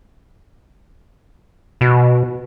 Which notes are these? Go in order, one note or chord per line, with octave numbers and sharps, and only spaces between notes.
B2